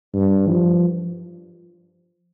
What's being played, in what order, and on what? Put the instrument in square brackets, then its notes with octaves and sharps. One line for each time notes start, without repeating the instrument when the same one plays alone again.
[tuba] G2
F3